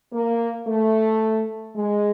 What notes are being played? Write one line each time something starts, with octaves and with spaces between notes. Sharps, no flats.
A#3
A3
G#3